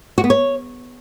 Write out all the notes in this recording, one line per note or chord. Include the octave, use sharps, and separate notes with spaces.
F#4
B3
C#5